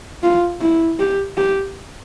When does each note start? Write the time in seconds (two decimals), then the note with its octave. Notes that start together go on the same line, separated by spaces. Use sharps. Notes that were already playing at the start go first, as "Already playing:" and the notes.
0.23 F4
0.61 E4
0.99 G4
1.37 G4